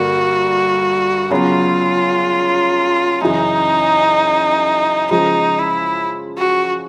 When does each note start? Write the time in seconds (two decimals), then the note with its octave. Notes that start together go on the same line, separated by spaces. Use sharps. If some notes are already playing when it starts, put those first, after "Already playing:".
Already playing: G2 D3 A#3 F#4
1.30 C#3 F#3 B3 F4
3.21 F#2 C#3 E3 D#4
5.11 C#3 F3 G#3 D#4
5.59 E4
6.38 F#4